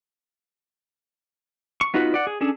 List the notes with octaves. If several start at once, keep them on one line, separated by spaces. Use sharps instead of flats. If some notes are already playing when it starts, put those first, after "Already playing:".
C#6
B3 D#4 F4 F#4 B4
D5 F#5
G#4
C#4 D4 G#4 A4